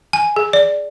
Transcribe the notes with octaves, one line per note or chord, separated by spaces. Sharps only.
G#5
G#4
D5